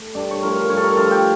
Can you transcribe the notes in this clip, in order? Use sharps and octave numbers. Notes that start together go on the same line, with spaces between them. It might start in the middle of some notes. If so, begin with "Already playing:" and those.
Already playing: A3
G2 D4
C#5
F3 A3 A#4
A#4
G2 C#5
A4
A#4
F3 A3 A4
G4